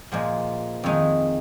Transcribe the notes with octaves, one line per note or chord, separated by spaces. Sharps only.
A#2 F3 G#3
F2 D#3 G#3 D#4